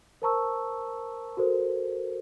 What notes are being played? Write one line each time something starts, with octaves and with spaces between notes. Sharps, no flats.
A#4 C5 A5 A#5 C#6 E6
F#4 A4 A#4 C5